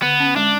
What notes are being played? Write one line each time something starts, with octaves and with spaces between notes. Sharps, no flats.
D3 B3
C#4
G#3 D4